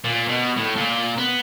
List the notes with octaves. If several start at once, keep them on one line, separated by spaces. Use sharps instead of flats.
A#2
B2
A2
A#2
B3